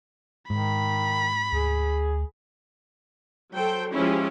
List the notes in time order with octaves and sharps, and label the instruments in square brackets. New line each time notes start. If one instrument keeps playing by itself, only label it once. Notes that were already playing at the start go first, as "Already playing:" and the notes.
[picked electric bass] G#2 [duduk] D#3 [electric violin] B5
[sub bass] D2 [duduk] G#4
[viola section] F#3 A4 C5 G5
F3 G#3 C#4 E4 F4 G4